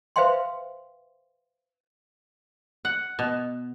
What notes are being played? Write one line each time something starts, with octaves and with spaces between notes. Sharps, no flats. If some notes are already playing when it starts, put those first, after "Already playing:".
B4 C5 E5 F5 G5 C6
F#5
B2